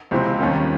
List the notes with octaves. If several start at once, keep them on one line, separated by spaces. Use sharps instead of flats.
C#2 C3 F3 C4
D#2 D#3 G3 A#3 C#4